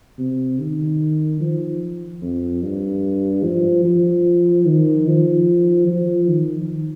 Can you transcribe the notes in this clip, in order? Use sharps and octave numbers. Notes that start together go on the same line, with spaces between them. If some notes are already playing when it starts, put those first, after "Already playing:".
C3
D#3
F3
F2
G2
F3
F3
D#3
F3
F3
D#3